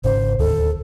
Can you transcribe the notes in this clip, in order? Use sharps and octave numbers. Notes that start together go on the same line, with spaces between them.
G#1 C#3 C5
D1 D#2 A4